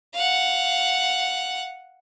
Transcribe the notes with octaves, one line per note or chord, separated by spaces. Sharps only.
F5 F#5